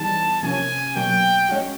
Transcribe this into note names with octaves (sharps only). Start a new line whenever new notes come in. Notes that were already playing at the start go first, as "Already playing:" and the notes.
Already playing: E3 G3 B3 D#4 G#4 A5
C3 F3 A#3 C#4 G#5
B2 F#3 A#3 G5
G#3 C#4 F#4